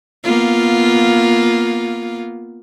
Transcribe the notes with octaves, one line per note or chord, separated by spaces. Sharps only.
A#3 B3 F4